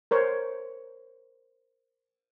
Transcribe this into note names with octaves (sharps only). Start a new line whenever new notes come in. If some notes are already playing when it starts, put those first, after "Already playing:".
A#4 C5 C#5